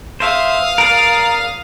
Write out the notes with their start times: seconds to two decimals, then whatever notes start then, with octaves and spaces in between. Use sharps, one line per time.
0.20 C5 E5 F5 D#6
0.78 A#4 D5